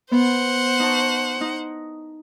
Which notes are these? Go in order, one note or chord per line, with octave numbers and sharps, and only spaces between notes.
B3 C5 F#5
D#4 A5 C#6
D#4